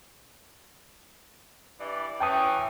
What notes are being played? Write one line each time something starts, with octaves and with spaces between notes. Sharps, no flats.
G2 E3 D5
E3 C#4 G5 A5 D#6